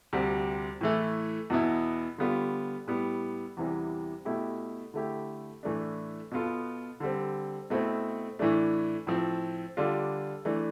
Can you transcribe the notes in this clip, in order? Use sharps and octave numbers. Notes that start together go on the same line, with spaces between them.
D2 C3 G3
A2 E3 A3
E2 B2 B3 E4
D3 G3 B3 F4
A2 G3 B3
E2 C3 E3 G3
B2 A3 E4 G4
D3 A3 E4 G4
A2 E3 A3 D4
B2 B3 F4 A4
D3 G3 C4
B2 A3 C4 E4
A2 E3 A3 D4
A2 F3 C4
D3 G3 D4 F4
E3 A3 D4